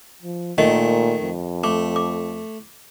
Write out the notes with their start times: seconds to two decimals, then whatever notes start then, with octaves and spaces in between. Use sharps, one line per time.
0.22 F3
0.58 A#2 D#3 A3 D#5
1.22 F2
1.64 A3 D6
1.96 D6